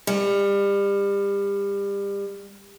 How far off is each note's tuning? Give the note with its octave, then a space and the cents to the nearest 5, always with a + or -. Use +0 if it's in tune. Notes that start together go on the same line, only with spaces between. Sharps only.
G3 +30